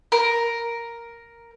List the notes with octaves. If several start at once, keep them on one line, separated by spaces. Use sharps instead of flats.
A#4